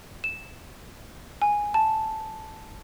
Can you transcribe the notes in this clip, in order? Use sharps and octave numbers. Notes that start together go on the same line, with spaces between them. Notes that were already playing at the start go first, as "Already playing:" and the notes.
E7
G#5
A5